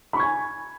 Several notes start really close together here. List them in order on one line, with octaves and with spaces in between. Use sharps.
B5 C#6 G#6 G#5